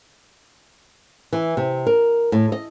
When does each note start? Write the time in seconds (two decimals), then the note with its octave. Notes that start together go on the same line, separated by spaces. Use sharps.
1.33 E3
1.57 C3
1.86 A#4
2.32 A2
2.52 D#5